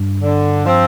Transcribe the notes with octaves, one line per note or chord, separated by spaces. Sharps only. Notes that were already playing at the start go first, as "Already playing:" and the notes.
Already playing: G2
D3
F3 C4